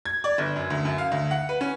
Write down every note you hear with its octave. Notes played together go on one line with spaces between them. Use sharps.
G#6
D5
G1
F#2
D2
F#2
F5
D2
F#5
B4
C#4